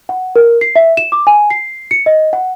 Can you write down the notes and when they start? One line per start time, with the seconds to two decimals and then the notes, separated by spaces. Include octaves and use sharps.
0.09 F#5
0.36 A#4
0.61 C7
0.76 E5
0.97 E7
1.12 D6
1.27 G#5
1.50 C7
1.91 C#7
2.06 D#5
2.33 F#5